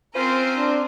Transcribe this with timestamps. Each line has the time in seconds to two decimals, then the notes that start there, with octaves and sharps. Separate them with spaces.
0.14 C4 C#4 F4 A#4 C5
0.57 D4